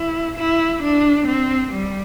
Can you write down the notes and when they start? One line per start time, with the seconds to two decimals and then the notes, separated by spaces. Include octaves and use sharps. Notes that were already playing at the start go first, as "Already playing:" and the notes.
Already playing: E4
0.37 E4
0.83 D4
1.28 C4
1.72 G3